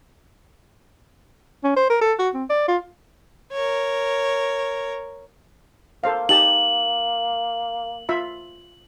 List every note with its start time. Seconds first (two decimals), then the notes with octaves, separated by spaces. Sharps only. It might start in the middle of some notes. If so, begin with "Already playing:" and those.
1.64 C#4
1.77 C5
1.90 A#4
2.02 A4
2.19 F#4
2.34 C4
2.50 D5
2.68 F4
3.52 A#4 C#5
6.04 A#3 A4 C5 F5
6.29 D#4 G4 A5 F#7
8.09 F4 E5 B5